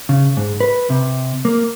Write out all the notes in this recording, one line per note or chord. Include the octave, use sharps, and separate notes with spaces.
C#3
G#2
B4
C3
A#3